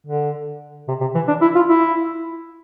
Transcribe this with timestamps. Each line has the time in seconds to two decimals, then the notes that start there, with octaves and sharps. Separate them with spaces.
0.06 D3
0.88 C3
1.01 C3
1.15 E3
1.28 D4
1.41 E4
1.55 F4
1.69 E4